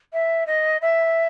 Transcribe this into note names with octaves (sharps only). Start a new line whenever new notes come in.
E5
D#5
E5